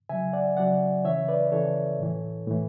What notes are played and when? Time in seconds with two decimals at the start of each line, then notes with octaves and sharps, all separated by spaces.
0.09 C#3 F#3 E5 G#5
0.33 D5 F#5
0.57 C#3 F#3 D5 F#5
1.05 C#3 E3 C#5 E5
1.28 B4 D5
1.52 C#3 E3 A4 C#5
1.99 A2 E3
2.47 A2 E3